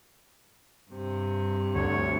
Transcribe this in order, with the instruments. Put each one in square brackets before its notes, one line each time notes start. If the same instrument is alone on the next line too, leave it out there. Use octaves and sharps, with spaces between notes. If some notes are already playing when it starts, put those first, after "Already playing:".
[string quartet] G2 C3
[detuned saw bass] D2 [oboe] C#5